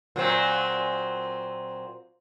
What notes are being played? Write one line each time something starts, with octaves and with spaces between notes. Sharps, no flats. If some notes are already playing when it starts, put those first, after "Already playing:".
A#2 F#3 C4